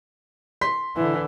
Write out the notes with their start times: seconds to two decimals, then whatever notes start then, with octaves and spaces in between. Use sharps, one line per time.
0.61 C6 B6
0.96 D3 E3 E4